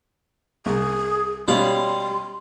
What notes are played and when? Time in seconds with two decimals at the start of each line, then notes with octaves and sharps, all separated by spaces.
0.66 C2 G#4
1.48 B2 G3 C#4 F5 C6